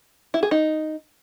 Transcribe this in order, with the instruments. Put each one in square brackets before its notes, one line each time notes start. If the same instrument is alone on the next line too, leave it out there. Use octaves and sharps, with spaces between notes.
[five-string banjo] E4
G#4
D#4